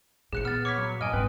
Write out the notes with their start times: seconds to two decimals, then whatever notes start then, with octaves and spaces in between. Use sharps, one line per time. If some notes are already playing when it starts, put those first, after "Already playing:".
0.33 A1 A#2 G#4 F#6 C#7
0.45 B3 F6 A6
0.65 C#5 D6 F6 B6
0.78 F#3
1.01 G2 D#5 G#5 F6
1.13 G#2 C4 B4